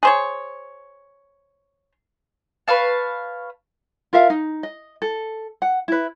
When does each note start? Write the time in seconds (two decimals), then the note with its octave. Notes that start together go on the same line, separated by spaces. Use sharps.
0.03 G#4 C5 C#5
2.68 B4 C#5 F5 A5
4.13 F4 A#4 E5 F5
4.30 D#4
4.63 D#5
5.02 A4
5.62 F#5
5.88 E4 B4